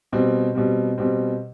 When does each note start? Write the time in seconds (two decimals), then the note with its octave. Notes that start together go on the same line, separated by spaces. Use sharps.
0.12 B2 G3 C4
0.55 B2 G3 C4
0.98 B2 G3 C4